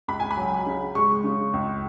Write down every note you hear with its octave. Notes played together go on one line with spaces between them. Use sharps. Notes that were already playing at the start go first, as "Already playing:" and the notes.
C#2 B5
G#5
B5
F#3
C#3
G#3 C#6
C#3
C#2